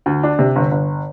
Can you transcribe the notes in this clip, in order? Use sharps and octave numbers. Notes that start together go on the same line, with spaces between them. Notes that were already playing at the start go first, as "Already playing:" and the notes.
D2
D4
C3
G1
G1